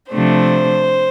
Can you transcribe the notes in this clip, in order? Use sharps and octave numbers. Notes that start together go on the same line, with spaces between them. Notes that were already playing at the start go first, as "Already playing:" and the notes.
C3 F3 A3 D4 C5